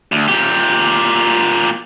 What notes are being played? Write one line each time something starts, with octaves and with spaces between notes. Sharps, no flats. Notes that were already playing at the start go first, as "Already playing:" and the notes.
D2
A#2 G4